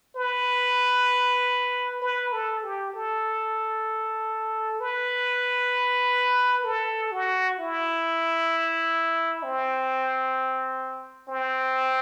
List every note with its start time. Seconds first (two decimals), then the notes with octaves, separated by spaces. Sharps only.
0.16 B4
2.02 B4
2.32 A4
2.64 G4
2.94 A4
4.80 B4
6.65 A4
7.12 F#4
7.58 E4
9.43 C4
11.29 C4